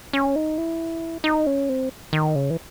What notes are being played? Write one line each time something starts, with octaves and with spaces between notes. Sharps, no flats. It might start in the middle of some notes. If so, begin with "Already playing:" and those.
C#4
D#4
E4
D#4
C#4
C4
D#3
C#3
E3